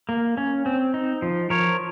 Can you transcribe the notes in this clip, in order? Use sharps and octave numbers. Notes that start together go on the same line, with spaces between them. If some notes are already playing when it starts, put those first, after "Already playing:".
A#3
C#4
C4
D#4
F3
F3 A#4 C#5